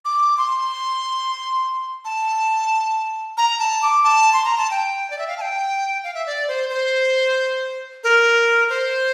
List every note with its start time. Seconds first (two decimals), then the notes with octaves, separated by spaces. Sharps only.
0.05 D6
0.38 C6
2.05 A5
3.37 A#5
3.59 A5
3.82 D6
4.03 A5
4.33 C6
4.45 A#5
4.58 A5
4.71 G5
5.10 D5
5.19 E5
5.28 F5
5.38 A5
5.41 G5
6.04 F5
6.14 E5
6.26 D5
6.48 C5
6.70 C5
8.04 A#4
8.69 C5